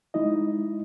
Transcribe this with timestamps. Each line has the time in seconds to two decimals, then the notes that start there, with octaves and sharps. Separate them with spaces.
0.14 G#3 D#4 E4 D#5